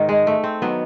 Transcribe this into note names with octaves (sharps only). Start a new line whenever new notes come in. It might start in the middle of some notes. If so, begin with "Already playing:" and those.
Already playing: G#2 D#3
G#3
A3
C4
D#3 F#3 B3